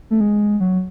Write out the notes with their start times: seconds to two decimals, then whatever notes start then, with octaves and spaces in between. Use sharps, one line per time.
0.11 A3
0.21 G#3
0.60 F#3